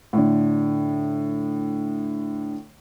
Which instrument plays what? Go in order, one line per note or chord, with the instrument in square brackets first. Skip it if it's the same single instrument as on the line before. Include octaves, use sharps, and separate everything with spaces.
[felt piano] A2 D3